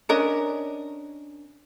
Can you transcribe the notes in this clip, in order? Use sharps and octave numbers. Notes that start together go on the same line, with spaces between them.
C#4 D4 A#4 D#5